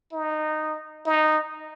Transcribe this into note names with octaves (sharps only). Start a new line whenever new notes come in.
D#4
D#4